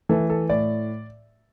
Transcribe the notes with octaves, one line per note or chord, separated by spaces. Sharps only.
E3 A3 A4
A4
A2 D5